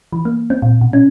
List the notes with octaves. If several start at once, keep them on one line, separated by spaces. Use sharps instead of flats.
E3
A#3
C4
A#2
B2
C#4